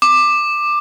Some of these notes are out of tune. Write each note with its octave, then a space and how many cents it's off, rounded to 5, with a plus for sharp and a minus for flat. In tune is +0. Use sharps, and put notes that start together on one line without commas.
D6 +15